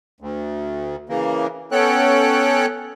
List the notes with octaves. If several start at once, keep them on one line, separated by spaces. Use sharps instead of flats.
D2
C#3 E3 A#3
B3 C#4 A4 C#5 G5 F#6